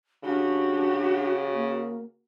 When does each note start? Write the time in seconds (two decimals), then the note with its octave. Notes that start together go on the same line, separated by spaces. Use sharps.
0.24 C#3 D4 F#4 G4
1.54 A#3